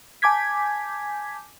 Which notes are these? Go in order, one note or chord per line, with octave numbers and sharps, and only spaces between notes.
G#5 A5 D6 G6 G#6 B6